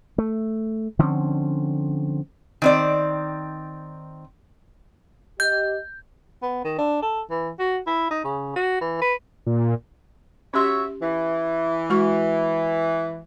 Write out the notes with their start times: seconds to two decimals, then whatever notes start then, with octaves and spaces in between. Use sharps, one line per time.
0.18 A3
0.99 D3 F3 C4 C#4
2.62 D#3 C4 D5
5.40 G4 D#5 G6
6.42 B3
6.64 D#3
6.78 D4
7.02 A4
7.30 E3
7.59 F#4
7.87 E4
8.11 D#4
8.24 C#3
8.56 F#4
8.81 E3
9.02 B4
9.46 A#2
10.54 C#4 F#4 G4 C#5 E5 C6
11.01 E3
11.90 G#3 F#4 C#6